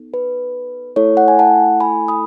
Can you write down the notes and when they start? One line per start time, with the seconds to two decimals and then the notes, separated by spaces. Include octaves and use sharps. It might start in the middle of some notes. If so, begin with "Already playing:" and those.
Already playing: B3 D#4 A4
0.14 B4
0.96 A3 E4 A4 C#5
1.17 F#5
1.28 G#5
1.39 F#5 A5
1.80 G#5 B5
2.08 B5 D#6